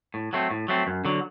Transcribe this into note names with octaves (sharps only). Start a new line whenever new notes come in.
A2
F#3 A3 C4
A2
F#3 A3 C4
F#2
D3 F#3